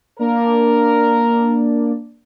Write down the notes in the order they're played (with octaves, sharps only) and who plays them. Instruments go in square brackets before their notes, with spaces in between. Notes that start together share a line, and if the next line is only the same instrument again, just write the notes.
[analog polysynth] A#3 D4 D5 [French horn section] A#4